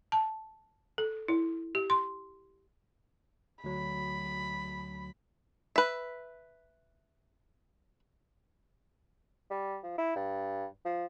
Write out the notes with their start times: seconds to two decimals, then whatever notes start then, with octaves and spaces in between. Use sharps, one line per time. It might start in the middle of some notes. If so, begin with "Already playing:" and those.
0.12 A5
0.98 A4
1.28 E4
1.75 G4
1.90 C6
3.64 D2 F#3 B5
5.76 B4 E5
9.50 G3
9.83 F3
9.98 E4
10.16 G2
10.85 F3